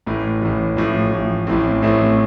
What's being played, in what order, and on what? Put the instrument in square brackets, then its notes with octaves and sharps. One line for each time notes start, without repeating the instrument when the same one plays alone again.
[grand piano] A1 A2 E3
A1 A2 E3
A1 A2 F3
A1 A2 F3
A1 A2 E3 A3 C4
A1 A2 E3 A3 C4